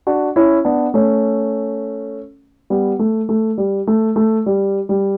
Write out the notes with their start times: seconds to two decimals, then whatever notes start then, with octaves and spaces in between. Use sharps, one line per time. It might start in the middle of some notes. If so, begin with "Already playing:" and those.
0.07 D4 F#4
0.36 C#4 E4
0.65 B3 D4
0.94 A3 C#4
2.70 G3 B3
2.99 A3
3.29 A3
3.58 G3
3.87 A3
4.16 A3
4.46 G3
4.89 G3